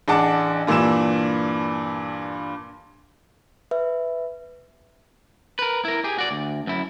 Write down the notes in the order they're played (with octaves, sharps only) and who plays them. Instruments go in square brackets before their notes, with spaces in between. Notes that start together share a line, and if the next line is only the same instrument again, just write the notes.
[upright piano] A1 D4 G#4 F#5 A5 D6
G2 A#2 E3 D4 E6 E7
[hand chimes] B4 E5
[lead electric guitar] A#4 B4
E4 A#4
G4 G#4
F#4 D5
D2
F#2 E4